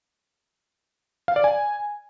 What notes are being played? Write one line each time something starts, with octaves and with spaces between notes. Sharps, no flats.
F5
D5
G#5